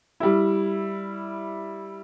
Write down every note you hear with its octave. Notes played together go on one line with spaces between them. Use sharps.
G3 E4